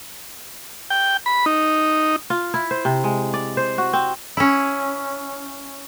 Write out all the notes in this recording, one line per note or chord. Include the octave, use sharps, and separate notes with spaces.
G5
B5
D#4
F4
E4
C5
C3
G#3
D5
C5
F#4
C4
C#4 E4